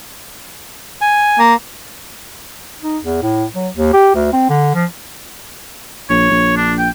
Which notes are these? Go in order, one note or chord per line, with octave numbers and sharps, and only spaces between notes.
G#5
A#3
D#4
E2
A2
F#3
D#2
G4
D2
C4
D3
F3
A#1 C#5
A#1
D4
G5